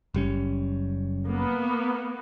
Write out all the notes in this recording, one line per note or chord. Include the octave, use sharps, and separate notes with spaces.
F#1 G3 C#4
A#3 B3